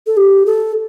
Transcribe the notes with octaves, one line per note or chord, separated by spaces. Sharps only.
A4
G4
A4